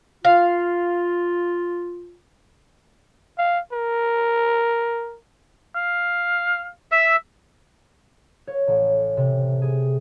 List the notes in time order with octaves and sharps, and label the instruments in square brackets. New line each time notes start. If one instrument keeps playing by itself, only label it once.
[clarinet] F4 [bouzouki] F5
[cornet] F5
A#4
[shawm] F5
[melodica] E5 E6
[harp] C#5
A1
C3
G#4